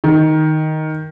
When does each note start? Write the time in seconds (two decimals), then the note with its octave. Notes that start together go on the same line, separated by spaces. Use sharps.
0.04 D#3